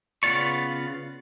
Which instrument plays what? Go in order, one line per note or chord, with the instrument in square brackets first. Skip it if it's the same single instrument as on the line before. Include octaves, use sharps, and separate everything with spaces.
[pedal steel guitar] C#3 B3 F4 D5 C#6